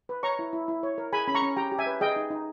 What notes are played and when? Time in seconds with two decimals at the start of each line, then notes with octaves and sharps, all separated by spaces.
0.09 B4
0.23 C#5 A#5 C#6
0.39 E4
0.53 E4
0.68 E4
0.83 C#5
0.98 A#4
1.13 G#4 G#5 B5
1.28 C#4 B5
1.35 A#5 C#6
1.42 C#4
1.56 G4 G5 A#5
1.72 G4
1.79 E5 G#5
1.87 B4
2.01 G#4 D#5 G5
2.16 D#4
2.30 D#4